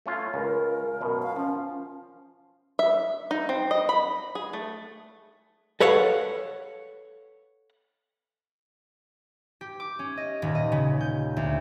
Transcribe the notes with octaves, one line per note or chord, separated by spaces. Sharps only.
A3 C#4 F4
C#2 A#4
F#2 B2
F5
F3 C#4
E5
D#4
C4
D#5
B5
G#4
A3
A4 B4 C#5 F5 F#5
G4
D6
C#4
D#5
D#1
D#5
C#3
G6
D2